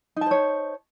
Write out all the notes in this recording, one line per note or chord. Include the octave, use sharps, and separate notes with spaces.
D#4 C5 C#5 A5